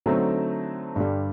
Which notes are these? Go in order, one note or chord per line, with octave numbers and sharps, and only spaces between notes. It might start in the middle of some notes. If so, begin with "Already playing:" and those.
D3 F#3 A3 C4 D#4
G2 D3 G3